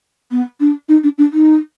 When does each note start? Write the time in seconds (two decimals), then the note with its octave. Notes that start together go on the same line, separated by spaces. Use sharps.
0.31 B3
0.60 D4
0.88 D#4
1.03 D4
1.18 D4
1.32 D#4